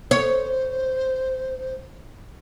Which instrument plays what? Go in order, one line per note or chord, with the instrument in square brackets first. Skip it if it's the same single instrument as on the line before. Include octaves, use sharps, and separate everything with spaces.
[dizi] C5 [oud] C#5